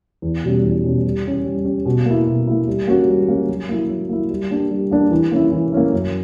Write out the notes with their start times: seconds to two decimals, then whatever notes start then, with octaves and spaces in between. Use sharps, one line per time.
0.22 E2
0.44 B2 G3 C#4
0.64 E2
0.84 B2 G3 C#4
1.04 G3
1.25 C#4 G4
1.45 G3
1.65 C#4 G4
1.86 B2
2.06 A#3 E4
2.27 B2
2.47 A#3 E4
2.68 G3
2.87 A#3 C#4 F#4
3.08 G3
3.28 A#3 C#4 F#4
3.49 F#3
3.69 A#3 E4
3.89 F#3
4.09 A#3 E4
4.30 G3
4.51 A#3 D4 G4
4.71 G3
4.91 A#3 D4 G4
5.11 E3
5.31 A#3 C#4 E4
5.52 E3
5.72 A#3 C#4 E4
5.93 F#2